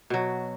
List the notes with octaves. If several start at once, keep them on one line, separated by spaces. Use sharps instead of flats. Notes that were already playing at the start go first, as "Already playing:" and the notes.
B2 F#3